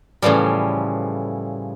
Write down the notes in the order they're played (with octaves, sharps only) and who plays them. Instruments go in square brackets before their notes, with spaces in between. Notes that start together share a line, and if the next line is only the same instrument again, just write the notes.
[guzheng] A2 C#3 E3 F3 G3